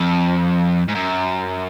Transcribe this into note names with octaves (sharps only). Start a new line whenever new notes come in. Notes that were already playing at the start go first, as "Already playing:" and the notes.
Already playing: F2
G#2
F#2